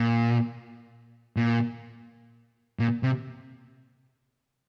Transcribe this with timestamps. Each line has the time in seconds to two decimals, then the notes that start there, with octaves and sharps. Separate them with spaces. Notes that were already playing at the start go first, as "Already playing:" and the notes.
Already playing: A#2
1.37 A#2
2.79 A#2
3.03 C3